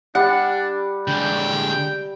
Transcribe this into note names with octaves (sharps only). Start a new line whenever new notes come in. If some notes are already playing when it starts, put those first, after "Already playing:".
G3 D4 F#5
D3 G#3 G5